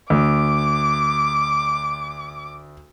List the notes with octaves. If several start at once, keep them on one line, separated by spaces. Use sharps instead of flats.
D2 D6